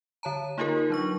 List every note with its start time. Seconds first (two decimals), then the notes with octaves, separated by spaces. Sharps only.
0.23 D3 C#5 A5 A#5
0.58 A#3 D#4 F4 G4 G#4 A#4
0.90 F#3 D4 C#6